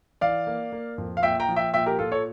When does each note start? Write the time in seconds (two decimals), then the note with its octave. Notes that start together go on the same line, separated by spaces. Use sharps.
0.21 E3 D5 F5
0.47 A#3
0.72 A#3
0.98 F2
1.17 F5
1.23 A#2 E5 G5
1.40 G5 A#5
1.49 F3
1.56 E5 G5
1.74 A#2 E5 G5
1.86 G4 A#4
1.99 A#2 F4 A4
2.11 A4 C#5